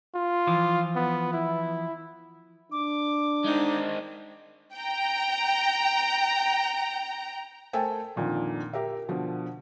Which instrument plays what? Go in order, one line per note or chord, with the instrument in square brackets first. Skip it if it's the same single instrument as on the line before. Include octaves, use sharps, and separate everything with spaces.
[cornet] F4
[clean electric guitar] E3 F3
[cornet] B3
E4
[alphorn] D4 [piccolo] D6
[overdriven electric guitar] G#3 C4 [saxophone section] D#4
[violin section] G5 A#5
[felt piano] A3 A4 A#4 C5 G5 G#5
F2 A#2 D3 D#3 F3
G4 A#4 E5
B2 D3 F3